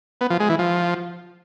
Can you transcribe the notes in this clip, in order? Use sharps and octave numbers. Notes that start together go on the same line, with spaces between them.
B3
F3
G#3
E3
F3